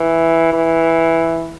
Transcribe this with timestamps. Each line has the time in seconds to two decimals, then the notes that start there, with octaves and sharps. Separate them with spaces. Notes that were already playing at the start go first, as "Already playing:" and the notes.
Already playing: E3
0.53 E3